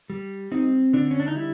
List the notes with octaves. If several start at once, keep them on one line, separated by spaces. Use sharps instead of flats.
G3
C4 D#4
D3 D4
C#4
D4
D#4
G3 E4